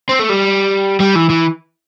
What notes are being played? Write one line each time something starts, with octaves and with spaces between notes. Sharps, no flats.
C4
A3
G3
G3
E3
E3